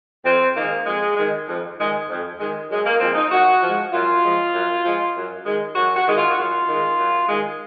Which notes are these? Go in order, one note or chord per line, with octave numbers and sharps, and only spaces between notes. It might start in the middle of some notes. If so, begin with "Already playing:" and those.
F2 C4
D#3 G#3 A#3
F2 G#3
D#3 G#3
F2
D#3 G#3
F2
D#3 G#3
F#2 G#3
A#3
F3 G#3 C4
D#4
F#2 F#4
F3
G#3
F#2 F4
F3 G#3
F#2
F3 G#3
F#2
D#3 G#3
F#2 F#4
F#4
D#3 G#3
F4
F#4
F#2 F4
D#3 G#3
F#2
D#3 G#3